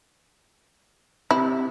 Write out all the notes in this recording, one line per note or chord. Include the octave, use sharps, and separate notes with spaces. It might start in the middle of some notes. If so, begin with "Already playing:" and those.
C4 E4 G4 E5